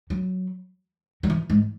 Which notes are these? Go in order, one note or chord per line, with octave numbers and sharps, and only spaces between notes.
F#3
F#3
E3
G#2